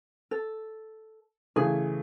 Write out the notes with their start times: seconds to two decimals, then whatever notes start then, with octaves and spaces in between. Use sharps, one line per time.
0.31 A4
1.56 C#3 E3 A3 G#4